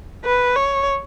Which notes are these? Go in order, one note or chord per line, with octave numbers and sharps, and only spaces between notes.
B4
C#5